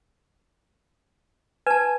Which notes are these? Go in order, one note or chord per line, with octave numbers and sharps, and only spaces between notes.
B4 G#5 A5